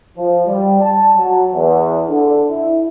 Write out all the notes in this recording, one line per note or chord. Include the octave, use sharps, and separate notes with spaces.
F3
G3
A5
F#3
E2
D3
E4